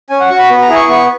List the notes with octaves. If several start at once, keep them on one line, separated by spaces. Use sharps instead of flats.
C#4 G#5
F#5
F#4 C#6
B5
B3
A#5
E4 G#4
C#6
B3 C#6